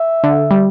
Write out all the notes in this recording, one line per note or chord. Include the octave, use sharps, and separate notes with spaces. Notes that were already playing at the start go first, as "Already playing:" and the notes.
Already playing: E5
D3
G3